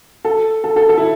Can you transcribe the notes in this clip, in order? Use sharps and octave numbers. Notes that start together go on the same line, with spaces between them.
A4
A4
A4
A4
E4